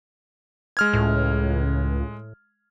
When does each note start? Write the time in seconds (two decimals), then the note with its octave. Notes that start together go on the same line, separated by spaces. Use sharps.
0.77 G#3 F6 G#6
0.93 C#2 A2